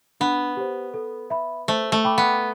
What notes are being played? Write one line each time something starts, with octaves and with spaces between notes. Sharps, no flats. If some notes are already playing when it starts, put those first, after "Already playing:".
B3 D4
G4 C5
A4
E5 B5
A3 C5
A3
G5 B5 D6
B3